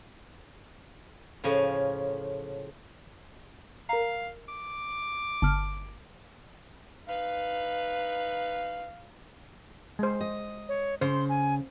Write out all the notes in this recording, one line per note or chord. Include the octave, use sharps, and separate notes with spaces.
A2 C#3 F3 F5 G#5
A#4 F5 A#5
D6
G1 A5 F6
D#4 B4 F5
G#3 C5
D#5
C#5
C#3 C5 C6
G#5